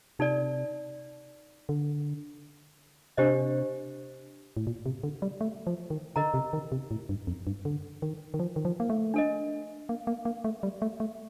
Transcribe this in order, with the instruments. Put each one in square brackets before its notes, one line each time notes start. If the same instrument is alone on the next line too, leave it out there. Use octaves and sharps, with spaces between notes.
[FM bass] C3 [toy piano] D#4 A4 D5
[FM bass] D3
[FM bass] C3 [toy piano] D4 G4 C5 D#5
[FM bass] A2
A#2
C3
D3
G3
A3
F3
D#3
[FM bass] D3 [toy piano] A#4 D#5 A#5
[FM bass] C3
D#3
C3
A2
G2
F2
G2
D3
D#3
D#3
F3
D#3
F3
A#3
A3
[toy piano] D4 A4 D#5
[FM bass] A#3
A#3
A#3
A3
G3
A3
A3